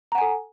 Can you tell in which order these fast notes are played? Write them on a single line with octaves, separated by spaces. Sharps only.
A#5 F#5 G#5 A4